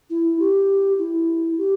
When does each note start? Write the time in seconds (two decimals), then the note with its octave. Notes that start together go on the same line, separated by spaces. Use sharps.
0.10 E4
0.39 G4
0.99 E4
1.58 G4